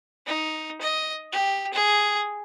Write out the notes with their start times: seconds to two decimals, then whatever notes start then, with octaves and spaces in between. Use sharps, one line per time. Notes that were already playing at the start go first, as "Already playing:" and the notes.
0.26 D#4
0.81 D#5
1.32 G4
1.73 G#4